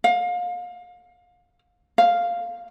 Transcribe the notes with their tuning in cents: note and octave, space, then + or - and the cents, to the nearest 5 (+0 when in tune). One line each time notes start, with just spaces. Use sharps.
F5 +30
F5 +0